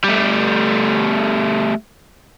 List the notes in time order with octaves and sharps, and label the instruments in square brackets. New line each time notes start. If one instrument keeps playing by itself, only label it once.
[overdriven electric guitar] G3 A3